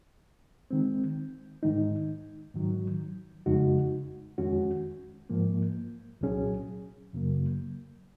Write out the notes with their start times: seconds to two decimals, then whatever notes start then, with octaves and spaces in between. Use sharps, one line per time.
0.71 D#3 G#3 C4
1.63 G#2 D#3 G#3 D#4
2.54 G#2 D#3 F#3
3.46 F2 C#3 G#3 D#4 F#4
4.38 F2 D#3 G#3 C#4 F#4
5.30 G#2 F3 A#3
6.21 C2 A#2 F#3 C#4 G#4
7.13 F#2 C#3 F#3 A#3